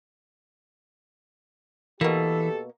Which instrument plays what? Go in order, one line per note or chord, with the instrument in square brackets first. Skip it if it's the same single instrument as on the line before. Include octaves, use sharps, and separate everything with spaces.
[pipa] B2 A#3 [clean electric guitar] E3 [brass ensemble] G4 A4